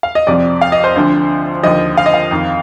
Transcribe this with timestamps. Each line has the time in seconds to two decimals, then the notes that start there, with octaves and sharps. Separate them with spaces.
0.03 F5
0.15 D#5
0.27 F2 C3 F3 D5
0.61 F5
0.72 D#5
0.84 C5
0.96 D2 D3 F3
1.63 D#2 D3 F3 D#5
1.97 F5
2.06 D#5
2.14 F5
2.31 F2 D#3